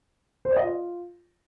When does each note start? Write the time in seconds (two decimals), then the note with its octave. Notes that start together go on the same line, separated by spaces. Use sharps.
0.45 C5
0.51 D5
0.56 D#5
0.62 F4